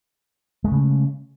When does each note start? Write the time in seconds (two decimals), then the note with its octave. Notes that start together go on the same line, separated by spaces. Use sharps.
0.64 G#3
0.68 A3
0.71 C#3